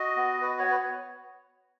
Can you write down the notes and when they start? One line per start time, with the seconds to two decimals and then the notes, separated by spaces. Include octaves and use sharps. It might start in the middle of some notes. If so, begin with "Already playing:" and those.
Already playing: F#4 D#5
0.16 B3
0.42 F#4 B4
0.59 C#5
0.68 B3 B4
0.76 C#5